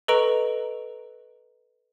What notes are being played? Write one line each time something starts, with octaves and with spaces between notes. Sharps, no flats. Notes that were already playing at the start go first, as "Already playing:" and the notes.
A4 B4 D#5 A#5 C#6 D7